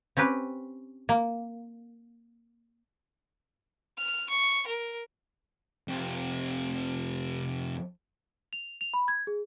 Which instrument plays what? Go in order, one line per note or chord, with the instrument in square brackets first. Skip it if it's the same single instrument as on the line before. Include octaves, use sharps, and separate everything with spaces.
[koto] C4 C#4 G4 B4
A#3
[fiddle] F6
C#6
A#4
[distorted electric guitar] F2 C3
[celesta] F7
F7
B5
G#6
G#4